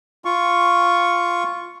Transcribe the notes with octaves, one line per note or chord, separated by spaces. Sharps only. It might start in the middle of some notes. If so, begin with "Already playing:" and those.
F4 C#6